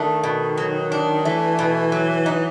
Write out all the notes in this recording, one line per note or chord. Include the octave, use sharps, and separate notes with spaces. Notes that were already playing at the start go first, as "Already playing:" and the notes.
Already playing: D#3 A3 D4
B2
F#3
D4
E3 A3
B2
F#3
D#4